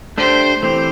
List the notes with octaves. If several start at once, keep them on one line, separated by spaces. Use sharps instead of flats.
A3 D4 G4 C5
E3 A3 C4 G4 C5